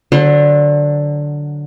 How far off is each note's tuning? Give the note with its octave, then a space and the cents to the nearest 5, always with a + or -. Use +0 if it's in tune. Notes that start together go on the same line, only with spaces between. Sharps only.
D3 +0 F#3 +0 C5 +45